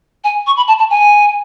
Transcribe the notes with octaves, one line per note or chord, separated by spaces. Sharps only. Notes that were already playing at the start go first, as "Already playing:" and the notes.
G#5
C#6
B5
A5
A5
G#5